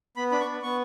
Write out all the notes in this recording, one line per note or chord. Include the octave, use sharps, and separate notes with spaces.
B3 B5
D4 B5
C#6
B3
B3 C#6